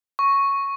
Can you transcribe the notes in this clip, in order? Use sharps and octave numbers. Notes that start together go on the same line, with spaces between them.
C#6